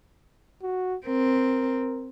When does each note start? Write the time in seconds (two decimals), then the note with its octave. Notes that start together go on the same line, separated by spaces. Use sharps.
0.62 F#4
1.06 C4 A#4